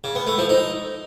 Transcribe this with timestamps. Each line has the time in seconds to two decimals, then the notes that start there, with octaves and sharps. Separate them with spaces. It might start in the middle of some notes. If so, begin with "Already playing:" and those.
0.04 C#3
0.15 B3
0.27 A3
0.38 F3
0.49 D#4